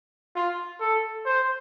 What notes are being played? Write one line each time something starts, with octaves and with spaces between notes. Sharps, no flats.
F4
A4
C5